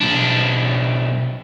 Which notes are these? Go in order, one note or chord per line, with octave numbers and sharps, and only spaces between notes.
B1 D4